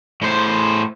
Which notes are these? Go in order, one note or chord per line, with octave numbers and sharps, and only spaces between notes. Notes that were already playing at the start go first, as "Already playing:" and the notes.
A2 C5